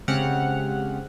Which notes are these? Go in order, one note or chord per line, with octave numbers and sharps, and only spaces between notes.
C#3 G#3 C4 G4 F#5 F6